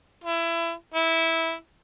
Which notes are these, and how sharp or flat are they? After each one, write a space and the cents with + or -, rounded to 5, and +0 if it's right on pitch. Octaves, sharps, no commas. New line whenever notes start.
E4 +25
E4 -10